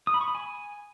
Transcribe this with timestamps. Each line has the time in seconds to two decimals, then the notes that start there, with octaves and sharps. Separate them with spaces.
0.07 D#6
0.14 B5
0.21 C#6
0.28 B5
0.35 G#5